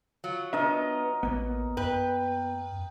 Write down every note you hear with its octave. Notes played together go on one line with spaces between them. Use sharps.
F#3 F4
B3 D4 A#4 D#5 E5
A1 A#3 B3
F#2 B4 G5